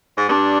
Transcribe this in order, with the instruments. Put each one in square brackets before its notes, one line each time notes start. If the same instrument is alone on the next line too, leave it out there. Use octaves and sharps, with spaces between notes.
[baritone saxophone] G#2
[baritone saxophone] G2 [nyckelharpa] D4